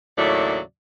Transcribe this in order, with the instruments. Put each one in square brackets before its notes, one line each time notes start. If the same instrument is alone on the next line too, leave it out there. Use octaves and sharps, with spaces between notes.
[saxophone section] D#2 A2 C#3 F#3 D5 E5